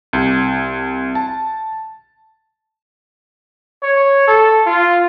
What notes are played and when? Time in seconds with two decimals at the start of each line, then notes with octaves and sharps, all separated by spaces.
0.13 C2
1.15 A5
3.82 C#5
4.27 A4
4.66 F4